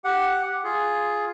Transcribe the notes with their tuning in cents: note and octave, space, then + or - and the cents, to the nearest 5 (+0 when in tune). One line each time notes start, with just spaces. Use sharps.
G4 +0 F#5 +0
F4 +0 G#4 +5